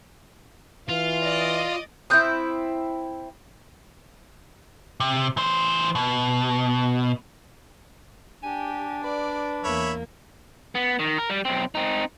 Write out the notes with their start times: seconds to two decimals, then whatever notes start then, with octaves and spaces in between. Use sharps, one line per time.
0.89 E3 F4 F5
1.22 D5 D#5
2.10 C4 E4 D#6 F#6 G6
5.00 C3
5.37 E3 C5
5.95 B2
8.43 D4 G4 G#5
9.04 B4 D5
9.64 E2 A#3 C#5 E5 B5
10.75 B3
10.99 D#3
11.18 A#4
11.30 G3
11.45 B1 C4
11.75 C4 D#4